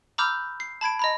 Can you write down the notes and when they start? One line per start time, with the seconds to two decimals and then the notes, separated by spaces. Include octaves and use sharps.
0.18 A#5 B5 D6 E6 F6 G6
0.60 C7
0.81 A5 B5 G#6 D7
0.99 D#5 A#5 B5